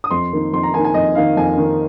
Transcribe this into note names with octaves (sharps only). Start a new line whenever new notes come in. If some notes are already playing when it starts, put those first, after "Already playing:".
D#6
F2 C6
D#3 A#3 D#4
F2 C6
A#5
D#3 A#3 D#4 G#5
G#5
F2 D#5
D#3 A#3 D#4 F5
F2 G#5
D#3 A#3 D#4